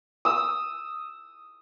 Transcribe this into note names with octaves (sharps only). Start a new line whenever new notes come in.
D#6 E6